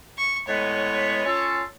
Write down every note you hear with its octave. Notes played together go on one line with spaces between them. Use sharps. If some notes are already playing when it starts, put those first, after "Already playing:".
C#6
A2 G#3 B3 C#5
C#4 F4 A4